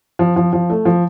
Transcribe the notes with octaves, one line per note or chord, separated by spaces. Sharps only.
F3
F3
F3
A3
F3